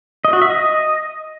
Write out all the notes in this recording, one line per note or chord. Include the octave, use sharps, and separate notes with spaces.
D#5
F#4
E5
D#5